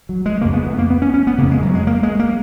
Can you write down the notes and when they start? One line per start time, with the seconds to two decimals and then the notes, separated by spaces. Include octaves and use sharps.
0.09 F#3
0.26 G#3
0.41 F2 C#3 A#3
0.53 B3
0.66 B3
0.78 A#3
0.90 B3
1.02 C#4
1.14 C#4
1.27 B3
1.38 F2 C#3 A#3
1.51 G#3
1.62 F#3
1.75 G#3
1.87 A#3
2.03 G#3
2.19 A#3